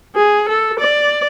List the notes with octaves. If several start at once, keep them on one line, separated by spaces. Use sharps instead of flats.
G#4
A4
D5